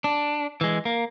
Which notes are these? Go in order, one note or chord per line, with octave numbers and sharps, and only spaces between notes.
D4
E3 G#3
A#3